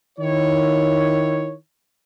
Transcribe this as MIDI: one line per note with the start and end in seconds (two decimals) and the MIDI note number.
0.19 1.55 51
0.19 1.55 64
0.19 1.55 73